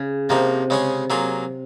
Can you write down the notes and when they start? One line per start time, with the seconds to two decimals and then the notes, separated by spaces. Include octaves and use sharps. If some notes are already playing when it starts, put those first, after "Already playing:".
Already playing: C#3
0.29 C3 F3 A#3 D#4
0.70 C#3 G#3 C#4 G#4
1.10 F#3 A#3 F4 G#4